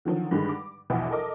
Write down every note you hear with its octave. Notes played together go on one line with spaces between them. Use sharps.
D3 D#3 F3 F#3
G2 D3 D#3 G#3
D6
A#1 E2 B2 F#4 G5
A4 A#4 D#5 D6